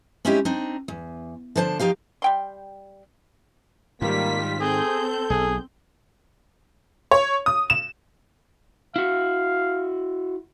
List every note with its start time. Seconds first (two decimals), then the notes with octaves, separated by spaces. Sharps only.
0.25 G#3 C4 C#4 D#4 E4 G4
0.45 C4 D4 D#4
0.88 E2
1.56 D3 F3 D4 C5 G#5 A5
1.79 F3 D#4 G4 F5
2.22 G3 G5 C6
4.02 G#2 D#3 G3 A#3 F4 B6
4.60 C4 G#4 A4 G6
5.30 B1 G#4
7.11 C#5
7.46 D#6
7.70 E7
8.96 E4 F#4 F5